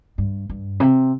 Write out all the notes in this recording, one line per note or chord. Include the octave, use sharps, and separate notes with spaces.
G2
G2
C3